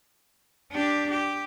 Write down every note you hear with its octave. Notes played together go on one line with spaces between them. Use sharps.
D4 G4
G4